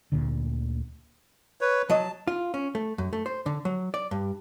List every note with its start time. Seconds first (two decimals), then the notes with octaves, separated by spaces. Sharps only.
0.12 D2 A#2 D3
1.61 B4 C#5
1.90 F#3 D#5 A5
2.27 F4
2.54 C#4
2.75 A3
2.98 F#2
3.13 A3
3.26 C5
3.46 D3
3.65 F#3
3.94 D5
4.11 G2